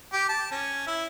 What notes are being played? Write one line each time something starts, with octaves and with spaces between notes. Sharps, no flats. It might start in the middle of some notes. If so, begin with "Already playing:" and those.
G4
A5
C#4
E4